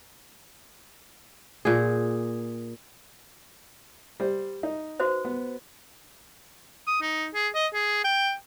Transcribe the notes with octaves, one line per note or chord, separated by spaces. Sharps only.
A#2 G#4
G3 C5
D#4
F#4 B4 C5
B3
D#6
D#4
G#4
D#5
G#4
G5